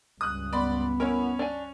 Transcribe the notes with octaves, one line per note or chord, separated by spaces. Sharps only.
C#2 G2 D#6 F#6
B3 D5 B5 C6
C#4 E4 A#4 C#5
D4 G#5